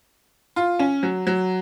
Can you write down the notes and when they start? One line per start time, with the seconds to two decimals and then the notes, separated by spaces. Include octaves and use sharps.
0.56 F4
0.79 C#4
1.03 F#3
1.27 F#3